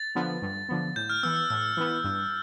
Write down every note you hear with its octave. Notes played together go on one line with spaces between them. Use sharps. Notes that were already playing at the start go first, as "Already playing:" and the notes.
Already playing: A6
D3 F3 B3
G2
D3 F3 B3
A2 G6
F6
E3 B3 E6
E6
A2 E6
E3 B3
G2